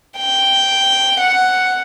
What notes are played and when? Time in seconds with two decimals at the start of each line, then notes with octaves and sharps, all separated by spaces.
0.18 G5
1.20 F#5